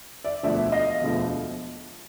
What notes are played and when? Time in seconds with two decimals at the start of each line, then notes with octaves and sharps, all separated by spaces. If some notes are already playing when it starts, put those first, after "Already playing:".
0.25 D5 E5
0.43 E1 D2 D3 F3 D5 E5
0.72 D#5 F5
1.01 E1 D2 D3 F3